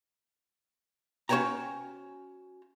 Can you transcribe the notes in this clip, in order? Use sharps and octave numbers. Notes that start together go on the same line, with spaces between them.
C#4 F#4 C5 C#5 G5 A#5